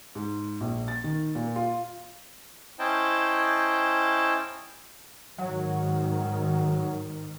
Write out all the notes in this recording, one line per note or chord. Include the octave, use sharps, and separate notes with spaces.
G#2
A#1
A6
D#3
A#2
F4
C#4 E4 C5 D#5 G5 A5
G#2 D#3 F#3